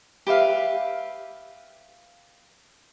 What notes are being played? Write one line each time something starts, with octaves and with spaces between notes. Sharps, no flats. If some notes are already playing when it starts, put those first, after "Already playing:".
G4 B4 E5 F5